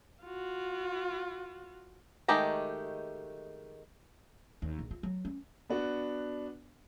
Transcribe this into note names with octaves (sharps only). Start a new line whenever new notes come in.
F4 F#4
D#3 G#3 A3 G4 A#5
D#2
A#1
F4
F#3
C#4
B3 D4 F#4